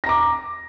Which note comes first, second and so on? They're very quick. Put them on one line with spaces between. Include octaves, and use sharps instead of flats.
A#6 A#5 D6